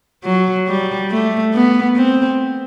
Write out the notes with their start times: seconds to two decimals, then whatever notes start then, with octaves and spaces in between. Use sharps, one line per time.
0.24 F#3
0.67 G3
1.11 A3
1.54 B3
1.96 C4